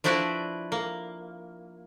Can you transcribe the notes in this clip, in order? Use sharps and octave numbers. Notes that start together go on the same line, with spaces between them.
F3 D4 E4 F#4 B4 D5
A#3